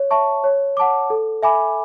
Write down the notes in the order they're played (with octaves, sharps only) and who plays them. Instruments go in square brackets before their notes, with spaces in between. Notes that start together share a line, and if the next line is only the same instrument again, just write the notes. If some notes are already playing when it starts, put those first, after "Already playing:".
Already playing: [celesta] C#5
E5 A5 C#6
C#5
F#5 A5 D6
A4
E5 G#5 B5 D6